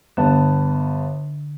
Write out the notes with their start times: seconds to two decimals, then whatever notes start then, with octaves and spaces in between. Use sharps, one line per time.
0.17 G1 D3 B3 A5